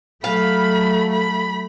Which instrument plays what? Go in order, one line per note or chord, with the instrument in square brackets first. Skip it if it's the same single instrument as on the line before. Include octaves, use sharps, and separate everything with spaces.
[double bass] F#3 A3 [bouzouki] F5 [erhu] B5
[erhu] B5